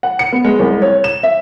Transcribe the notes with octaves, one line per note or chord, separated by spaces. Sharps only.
F#5
C#7
B3
G#3
C2
C#5
E7
E5